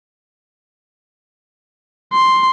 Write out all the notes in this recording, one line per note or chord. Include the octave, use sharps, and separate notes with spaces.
C6